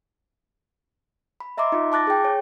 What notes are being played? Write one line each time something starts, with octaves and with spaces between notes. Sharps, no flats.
B5
D#5 E5 A#5 C6 D6
D#4 F4
A5 D6 F#6 A6 A#6
G#4 G5
C#5